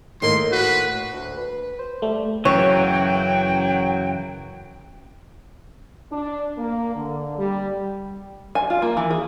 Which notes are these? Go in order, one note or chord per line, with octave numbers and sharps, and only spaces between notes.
A2 D#3 A#3 C6
F#4 B4
D2
B4
C5
G3 A3
F#2 C#3 E3 F#3 C#5 G5
D4
A#3
D3
G3
G#5
F4
A#3
E3
G#4